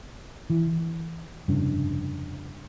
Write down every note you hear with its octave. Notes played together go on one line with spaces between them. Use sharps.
E3
F1 G2 C#3